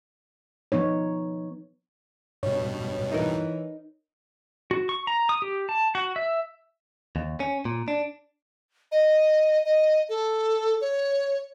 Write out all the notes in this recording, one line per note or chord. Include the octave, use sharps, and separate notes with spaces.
F3 B3 D#4 C#5
G2 B2 C#5
E3 D#4 A#4
F#4
C#6
A#5
D#6
G4
A5
F#4
E5
D#2
C#4
A#2
D4
D#5
D#5
A4
C#5